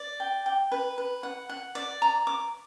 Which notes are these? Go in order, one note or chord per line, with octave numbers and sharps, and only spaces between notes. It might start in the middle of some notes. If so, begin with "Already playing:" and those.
Already playing: D5
G5
G5
B4
B4
F#5
F#5
D5
A#5
D6